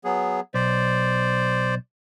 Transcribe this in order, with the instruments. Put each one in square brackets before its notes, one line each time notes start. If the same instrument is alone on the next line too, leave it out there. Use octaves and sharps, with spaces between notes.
[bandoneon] F#3 B3 G#4
[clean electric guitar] B1 [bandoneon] C5 D5